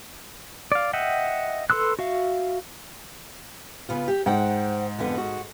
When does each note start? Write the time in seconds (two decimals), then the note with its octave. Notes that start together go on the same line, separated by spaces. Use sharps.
0.72 D5 F5
0.93 D#5 E5 F#5 G5
1.70 A4 B4 C6 E6 F#6
1.99 F#4 E5 F5
3.89 C#3 B3 F4
4.08 G4
4.26 G#2 C5 F#5 G5
4.99 F2 D3 B3
5.18 F#4